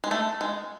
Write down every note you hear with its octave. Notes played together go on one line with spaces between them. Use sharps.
G#3
A3
G#3